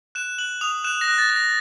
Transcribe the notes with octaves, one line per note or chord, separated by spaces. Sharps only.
F#6 E7
F#6 F#7
D#6 F7
F#6 E7
A#6
F#6
A6
F#6
A#6